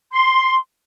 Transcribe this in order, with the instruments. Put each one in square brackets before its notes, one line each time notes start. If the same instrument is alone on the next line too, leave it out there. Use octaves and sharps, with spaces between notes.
[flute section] C6